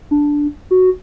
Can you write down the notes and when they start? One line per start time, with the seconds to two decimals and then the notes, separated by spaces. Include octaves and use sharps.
0.11 D4
0.71 F#4